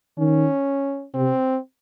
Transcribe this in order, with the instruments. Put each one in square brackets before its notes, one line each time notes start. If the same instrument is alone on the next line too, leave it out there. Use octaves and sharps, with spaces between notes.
[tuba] D#3 [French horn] C#4
[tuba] C3 [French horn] C4